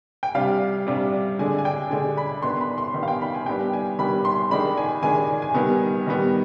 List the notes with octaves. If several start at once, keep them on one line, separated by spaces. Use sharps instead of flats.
G5
C3 G3 D4 F5
C3 G3 D4
D3 G#3 D4 G#5
G#5
G5
D3 G#3 D4 G#5
B5
D#3 B3 D4 C6
B5
C6
D#3 B3 D4
F5
G5
B5
G#5
D#3 G3 B3 D4 G5
G#5
D#3 G3 B3 D4 B5
C6
D#3 G#3 D4 B5
G#5
D#3 G#3 D4 G#5
G#5
D#3 G3 B3
D#3 G3 B3